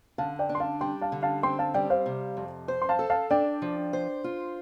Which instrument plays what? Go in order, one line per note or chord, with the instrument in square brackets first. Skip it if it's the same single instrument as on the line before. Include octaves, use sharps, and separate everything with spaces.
[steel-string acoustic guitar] D3 [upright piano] F5 A5
[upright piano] D5 G5
[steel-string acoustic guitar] D4
[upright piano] C6
F5 A5
[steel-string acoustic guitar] G3 [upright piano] G5 C6
[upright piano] F5 A5
[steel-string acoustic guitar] D3
[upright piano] F5 A5
[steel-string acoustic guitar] C4 [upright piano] G5 C6
[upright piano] F5 A5
[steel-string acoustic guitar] G3 [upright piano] D5 G5
[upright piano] C5 F5
[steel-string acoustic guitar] C3
F2
C5
[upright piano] C6
F5 A5
[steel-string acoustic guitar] A4
[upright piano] F5 A5
[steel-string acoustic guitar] D4 [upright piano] D5 G5
[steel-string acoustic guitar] F3
C5
F4